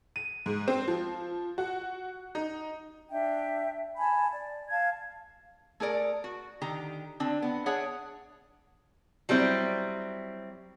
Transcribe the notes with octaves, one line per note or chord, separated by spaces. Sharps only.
D#7
G#2
C4
F3
F#4
D#4
D4 E5 G5
G#5 A5 B5
D5
F5 A5 G#6
A3 G#4 A#4 D5
F#4
D3 D#3 G4 A#5
D3 C4 D4
B3
D4 G#4 C#5 E5 F#5
F#3 G3 C4 E4